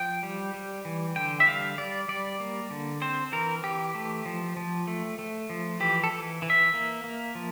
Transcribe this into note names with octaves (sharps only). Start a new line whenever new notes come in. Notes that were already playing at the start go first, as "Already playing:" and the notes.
Already playing: F3 G5
G3
G3
E3
D3 G5
E5
G3 F5
G3 D5
G3 D5
A#3
D3
C4 C5
E3 A#4
E3 G4
A3
F3
F3
A3
A3
F3
E3 G4
A4
E3
E3
E5
A#3
A#3
F3